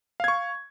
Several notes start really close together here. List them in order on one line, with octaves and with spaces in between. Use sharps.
F5 G#6 C#6